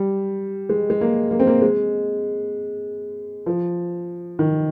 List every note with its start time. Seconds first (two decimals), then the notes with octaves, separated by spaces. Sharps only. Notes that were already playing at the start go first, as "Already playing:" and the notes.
Already playing: G3
0.69 G#3
0.90 G#3
1.01 A#3
1.31 A#3
1.40 C4
1.47 A#3
1.62 G#3
3.46 F3
4.39 D#3